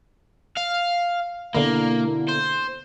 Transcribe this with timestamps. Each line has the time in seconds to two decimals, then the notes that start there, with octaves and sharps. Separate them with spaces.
0.57 F5
1.55 B2 D3 A#3 E4
2.29 C5